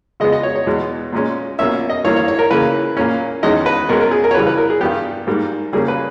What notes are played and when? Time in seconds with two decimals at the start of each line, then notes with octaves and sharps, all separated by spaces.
0.20 C#3 G#3 B3 D#5
0.32 D#5
0.43 C#5
0.56 C#5
0.67 E2 B2 G#3
1.13 A#2 G#3 C#4
1.59 B2 A#3 C#4 E5
1.90 D#5
2.04 G2 E3 A#3 C#5
2.16 C#5
2.28 C#5
2.39 A#4
2.50 C#3 E3 A#3 C#4 B4
2.97 A#2 A#3 C#4
3.43 E2 D#3 G#3 C#4 D#5
3.66 B4
3.89 B2 G#3 C#4 A#4
4.01 A#4
4.11 G#4
4.24 A#4
4.31 C#5
4.35 C#3 E3 G3 B4
4.47 B4
4.58 A#4
4.70 G#4
4.81 G2 G3 B3 G4
5.27 G#2 G3 A#3
5.73 C#3 G3 A#3 C#4 G#4
5.88 B4